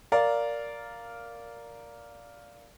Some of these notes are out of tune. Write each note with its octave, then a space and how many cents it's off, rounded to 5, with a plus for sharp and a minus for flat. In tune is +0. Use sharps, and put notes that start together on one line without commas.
A#4 +0 D5 -10 F5 +0